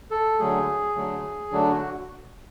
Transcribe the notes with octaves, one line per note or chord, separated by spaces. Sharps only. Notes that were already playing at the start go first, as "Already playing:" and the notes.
A4
D3 F#3 A3 G#4
D3 F#3 A3
D3 F#3 A3 D4
F#4